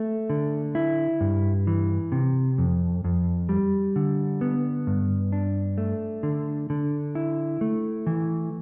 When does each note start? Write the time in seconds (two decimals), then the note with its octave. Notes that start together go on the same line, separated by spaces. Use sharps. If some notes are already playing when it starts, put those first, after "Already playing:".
Already playing: A3
0.30 D3
0.75 E4
1.21 G2
1.67 E3
2.12 C3
2.58 F2
3.04 F2
3.49 G3
3.96 D3
4.41 B3
4.87 G2
5.32 D4
5.78 A3
6.23 D3
6.70 D3
7.15 E4
7.61 A3
8.07 E3